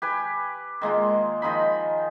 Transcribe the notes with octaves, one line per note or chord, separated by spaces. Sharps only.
G4 B4 G#5
D#3 G#3 A#3 F4
D#3 F3 D#4 B5